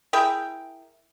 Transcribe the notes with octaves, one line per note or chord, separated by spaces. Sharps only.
E4 G#4 A#4 G5